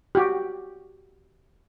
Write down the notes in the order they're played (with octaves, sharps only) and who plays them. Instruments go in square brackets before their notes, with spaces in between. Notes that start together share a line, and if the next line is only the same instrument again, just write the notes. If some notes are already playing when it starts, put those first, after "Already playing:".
[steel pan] F#4 G4